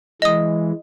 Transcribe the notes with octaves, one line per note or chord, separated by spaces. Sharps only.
E3 G#3 D#5 D#6